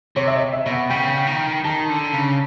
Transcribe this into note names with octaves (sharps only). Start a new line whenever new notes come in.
C3 C#5
E5
D#5
E5
B2
F#5
C#3 G5
D#3
D#3 A5
D3
C#3